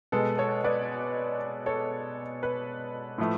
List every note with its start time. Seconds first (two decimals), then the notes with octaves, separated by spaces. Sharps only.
0.12 B2 G#3 B3 A4
0.38 A4 C#5
0.64 B4 D5
1.66 A4 C#5
2.43 B4
3.18 A2 F3 A3